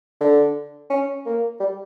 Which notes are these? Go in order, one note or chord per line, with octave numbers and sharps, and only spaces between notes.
D3
C#4
A#3
G3